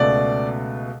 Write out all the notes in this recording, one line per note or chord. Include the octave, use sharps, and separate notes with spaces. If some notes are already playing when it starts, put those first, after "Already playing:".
Already playing: C#2 B2 A3 D5